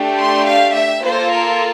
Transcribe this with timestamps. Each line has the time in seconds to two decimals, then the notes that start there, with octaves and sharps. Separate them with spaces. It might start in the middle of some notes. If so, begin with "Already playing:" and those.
Already playing: A3 D4 G4
0.18 C6
0.47 F5
0.75 E5
1.03 A#3 F4 A4 C5
1.32 A#4